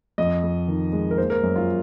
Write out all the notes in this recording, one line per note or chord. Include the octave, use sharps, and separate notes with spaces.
F2 D#5
F2
D#3
G#3
A#4
A#3 C5
A#4
F#2
F4